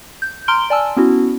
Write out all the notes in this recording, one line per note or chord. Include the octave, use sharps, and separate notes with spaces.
G6
A#5 C6 F6 D7 G7
D5 G#5 A5 E6
B3 C#4 E4 F#4